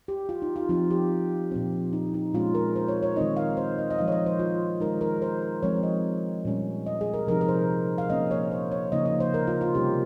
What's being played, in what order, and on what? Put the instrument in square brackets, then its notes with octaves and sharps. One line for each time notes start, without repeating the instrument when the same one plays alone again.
[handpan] G4
F4
D#4
F4
F3 C4 D#4 F4
G4
A#2 F3 C4
D#4
D#4
A#2 G#3 C#4 F4
A#4
C5
C#5
C#5
D#3 G#3 C4 D#4 D#5
F5
C5
D#5
D#5
F3 G#3 D#4 F5
C#5
D#5
C5
F4
D#3 G#3 D#4 A#4
A#4
C5
F3 G#3 C4 C#5
D#5
A#2 G3 C#4
D#5
G#4
A#4
C3 F3 C4 D#4 A#4
A#4
C5
F5
A#2 F3 A#3 C#4 D#5
C#5
C5
C#5
C#3 F3 A#3 D#4 D#5
D#5
C5
A#4
F4
F4
C3 G3 A#3 C#4 G4